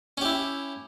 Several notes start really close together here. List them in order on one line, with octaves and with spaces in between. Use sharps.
C#4 G4 E4